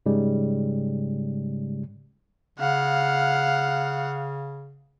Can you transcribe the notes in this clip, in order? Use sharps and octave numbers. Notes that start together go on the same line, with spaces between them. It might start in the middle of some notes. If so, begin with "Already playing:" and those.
G#2 C#3 G3 G#3
C#3 F5 F#5